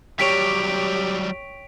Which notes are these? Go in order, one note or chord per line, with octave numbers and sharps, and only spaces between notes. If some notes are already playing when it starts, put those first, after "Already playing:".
F#3 G3 G4 C#5 G5 B6 D7 F7